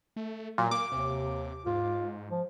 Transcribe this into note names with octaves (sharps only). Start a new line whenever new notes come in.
A3
A#2 F#3
A#3 D6
D#2 C3
G#2 F4
F3